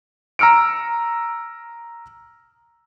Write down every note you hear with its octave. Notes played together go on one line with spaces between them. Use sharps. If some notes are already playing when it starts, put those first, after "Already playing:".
A#5 E6 F6 C#7 D7